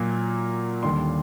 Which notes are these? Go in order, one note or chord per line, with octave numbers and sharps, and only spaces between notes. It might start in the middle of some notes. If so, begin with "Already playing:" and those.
Already playing: A#2 F#3 A#3
D#2 D3 G3 C6